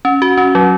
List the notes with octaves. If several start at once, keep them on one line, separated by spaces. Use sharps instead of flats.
C#4
F#4
C#4
F#3